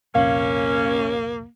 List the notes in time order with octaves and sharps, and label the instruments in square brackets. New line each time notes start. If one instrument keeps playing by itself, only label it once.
[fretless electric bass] C2 F2 A#2 [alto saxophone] A#3 [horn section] C#4 [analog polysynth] F5